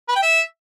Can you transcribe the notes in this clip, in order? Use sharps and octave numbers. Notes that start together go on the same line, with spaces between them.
B4
G5
E5